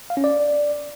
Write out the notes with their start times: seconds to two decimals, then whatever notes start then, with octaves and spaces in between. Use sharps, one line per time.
0.10 F5
0.17 C#4
0.24 D5